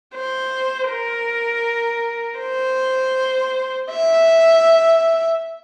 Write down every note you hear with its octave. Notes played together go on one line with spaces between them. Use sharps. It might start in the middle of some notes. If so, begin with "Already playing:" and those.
C5
A#4
C5
E5